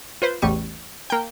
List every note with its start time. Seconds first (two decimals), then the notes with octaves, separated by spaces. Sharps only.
0.22 F4 B4 C5
0.42 A1 E2 G3 C#6 D#7
1.10 A#3 G5